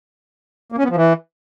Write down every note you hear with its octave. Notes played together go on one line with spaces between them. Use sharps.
A#3
C#4
B3
F3
E3